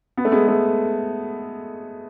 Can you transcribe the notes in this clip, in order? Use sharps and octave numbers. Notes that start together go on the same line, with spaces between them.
B3
A3
G#3 B3
A3